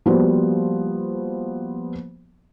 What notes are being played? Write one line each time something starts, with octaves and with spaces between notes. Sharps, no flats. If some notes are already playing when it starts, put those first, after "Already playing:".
F3 G3 A#3 B3 F#4 C5